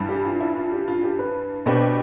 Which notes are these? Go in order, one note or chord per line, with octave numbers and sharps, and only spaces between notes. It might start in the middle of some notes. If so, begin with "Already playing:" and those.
Already playing: G2 E3 G3
G4
F4
E4
F4
G4
F4
G4
B4
B2 B3 D4 G4 C5